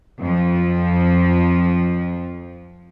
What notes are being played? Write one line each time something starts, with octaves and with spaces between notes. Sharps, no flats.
F2 F3